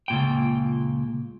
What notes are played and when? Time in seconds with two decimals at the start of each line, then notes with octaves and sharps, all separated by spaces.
0.08 C#2 A#2 G5